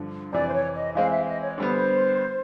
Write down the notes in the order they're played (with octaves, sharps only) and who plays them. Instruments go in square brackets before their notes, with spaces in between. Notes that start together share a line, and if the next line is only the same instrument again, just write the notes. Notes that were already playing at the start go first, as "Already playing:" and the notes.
Already playing: [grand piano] G2 D3 F3
[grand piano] F2 C3 E3 [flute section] D5
[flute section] C5
C#5
D#5
[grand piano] E3 G#3 C4 [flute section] F5
[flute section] E5
D#5
C#5
[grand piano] D3 G3 B3 [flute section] C5